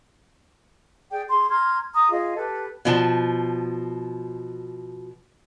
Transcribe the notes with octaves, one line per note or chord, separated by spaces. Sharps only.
G#4 D5 G5
G#4 C6
A#5 C6 F6 G#6
A#5 D#6
F4 G#4 D#5
G4 A4 B4
B2 F3 A5